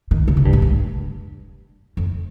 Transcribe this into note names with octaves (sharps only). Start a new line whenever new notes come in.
D#3
C#3
C3
G2
A#2
G2
F2